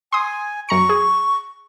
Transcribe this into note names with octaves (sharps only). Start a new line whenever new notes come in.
G#5 C6 D#6
F#2 A#5 C#6 C#7
G#4